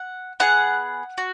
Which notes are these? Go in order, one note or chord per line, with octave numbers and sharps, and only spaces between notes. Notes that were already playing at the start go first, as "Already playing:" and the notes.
Already playing: F#5
B3 G#4 F#5
F#4